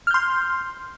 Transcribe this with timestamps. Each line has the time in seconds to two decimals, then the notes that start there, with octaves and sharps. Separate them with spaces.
0.07 F6
0.11 G6
0.14 C6